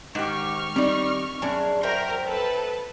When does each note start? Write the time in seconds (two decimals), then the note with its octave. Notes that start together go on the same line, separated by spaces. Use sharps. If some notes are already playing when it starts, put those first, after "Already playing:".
0.15 G#2 D#3 G4 C#6 F6
0.76 G3 C4 D#4 D5
1.42 F#2 D4 G#4
1.83 F#4 A#4 C5 E5 G5
2.26 A4 B4 A5